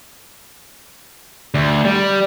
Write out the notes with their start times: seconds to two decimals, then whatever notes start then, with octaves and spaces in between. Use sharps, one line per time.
1.54 D2
1.85 G3